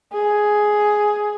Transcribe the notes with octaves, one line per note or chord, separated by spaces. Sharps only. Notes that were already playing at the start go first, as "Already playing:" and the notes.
G#4